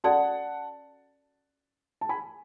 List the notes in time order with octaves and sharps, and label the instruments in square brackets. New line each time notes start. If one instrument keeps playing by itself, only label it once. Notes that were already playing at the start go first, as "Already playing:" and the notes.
[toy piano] C#4 F#4 A4 D5 [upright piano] F#5 A5
[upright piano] A5
G#5 B5